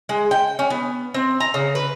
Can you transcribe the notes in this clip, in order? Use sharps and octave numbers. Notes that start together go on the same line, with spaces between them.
G#3
G5
C#4
B3
C4
A#5
C#3
B4